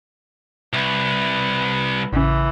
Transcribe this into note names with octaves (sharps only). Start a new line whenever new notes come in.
C2 B4
A1 C#3 E3